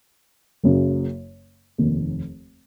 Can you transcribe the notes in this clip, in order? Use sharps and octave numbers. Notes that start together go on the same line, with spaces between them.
F#1 F#2 C#3
F1 D#2 D#3